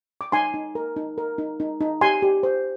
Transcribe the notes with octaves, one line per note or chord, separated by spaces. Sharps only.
D6
D#4 G#5 C6
D#4
A#4
D#4
A#4
D#4
D#4
D#4
G4 G#5 C6
G4
C5